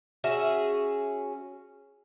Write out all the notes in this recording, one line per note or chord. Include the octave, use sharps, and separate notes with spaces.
C#4 F#4 G#4 E5